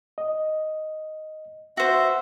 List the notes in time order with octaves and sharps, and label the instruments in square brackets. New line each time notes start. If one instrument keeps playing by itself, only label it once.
[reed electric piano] D#5
[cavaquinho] F#4 C5 [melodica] E5